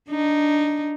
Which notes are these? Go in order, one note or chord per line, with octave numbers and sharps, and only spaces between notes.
D4 D#4